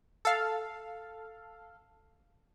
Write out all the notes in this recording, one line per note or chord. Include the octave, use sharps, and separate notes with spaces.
A4 F5